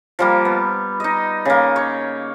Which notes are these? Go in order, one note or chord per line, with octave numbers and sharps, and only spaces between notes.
F3 G3 A#3
B3
D#4 D#5
C#3 A#3
C#5